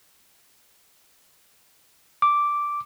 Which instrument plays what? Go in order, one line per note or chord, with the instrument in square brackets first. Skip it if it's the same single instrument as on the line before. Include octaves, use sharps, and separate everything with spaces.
[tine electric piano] D6